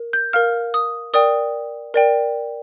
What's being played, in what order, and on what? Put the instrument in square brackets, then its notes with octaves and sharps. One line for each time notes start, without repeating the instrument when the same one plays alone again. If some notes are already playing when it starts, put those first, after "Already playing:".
Already playing: [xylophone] A#4
G6
A#4 F5 F6
D#6
A#4 D5 G5 D#6
A#4 D5 G5